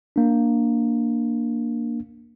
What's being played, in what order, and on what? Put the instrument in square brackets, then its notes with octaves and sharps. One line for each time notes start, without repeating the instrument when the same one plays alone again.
[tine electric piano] A#3 D4